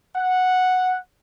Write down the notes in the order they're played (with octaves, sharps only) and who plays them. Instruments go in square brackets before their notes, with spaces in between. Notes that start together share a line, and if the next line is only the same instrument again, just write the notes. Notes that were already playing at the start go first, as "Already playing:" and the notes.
[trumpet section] F#5